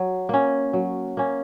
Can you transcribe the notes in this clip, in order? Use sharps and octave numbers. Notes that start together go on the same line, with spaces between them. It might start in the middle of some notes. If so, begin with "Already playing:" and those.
Already playing: F#3
A#3 C#4
F#3
A#3 C#4